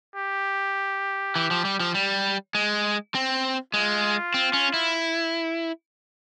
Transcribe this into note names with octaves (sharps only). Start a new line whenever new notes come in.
G4
E3
F3
G3
F3
G3
G#3
C4
G#3 F4
C4
C#4
E4